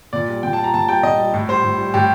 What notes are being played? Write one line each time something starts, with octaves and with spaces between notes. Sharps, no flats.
A#2 D5
G3
A#2 G5
A5
G3
A#5
A#2 A5
G3 G5
A#2 D#5
G3
A2
G3 C5
A2
G3
A2 G4